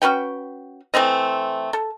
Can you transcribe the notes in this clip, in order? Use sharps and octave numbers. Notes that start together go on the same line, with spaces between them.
C#4 F#4 B4 G5
E3 A3 C4 D#5
A4